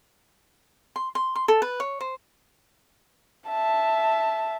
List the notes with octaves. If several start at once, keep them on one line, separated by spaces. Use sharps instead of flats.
C6
C6
C6
A4
B4
C#5
C5
E5 A5